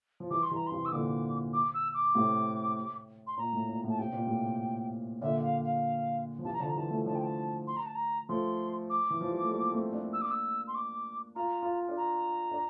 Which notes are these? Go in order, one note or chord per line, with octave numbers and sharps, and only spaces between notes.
F3
E3 G3 D6
C6
E3 G3
A#5
C6
C3 E3
E6
A#2 D3 D6
D6
E6
D6
A2 C3
C6
A#2 A#5
A2
A#2
A2
A5
C3 G5
A#2
A2 C3
A#2 D3 E5
F5
F5
F3
C3 E3 A5
A#5
D3 F3 A5
A#5
E3 G3 A5
F3 A3
D3 F3 A5
G5
A5
C6
A#5
A5
A#5
F3 A3 C6
D6
E3
F3
G3
A3
G3 A#3
A3 C4
A#3 D4
E6
D6
E6
C6
D6
F4 A#5
F4
D4 F4
A#5
D4